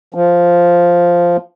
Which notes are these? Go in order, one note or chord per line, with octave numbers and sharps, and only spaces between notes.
F3